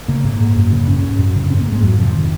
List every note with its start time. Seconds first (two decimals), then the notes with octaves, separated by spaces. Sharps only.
0.08 C#3 A#3
0.24 G#2 A#3
0.40 G#2
0.56 F#2
0.72 C#3
0.87 G#2 C#4
1.04 G#2
1.19 F#2
1.35 C#3
1.43 C#4
1.50 G#2 C4
1.61 A#3
1.66 G#2
1.72 G#3
1.83 F2 F#3
1.98 C3 F3
2.15 D#3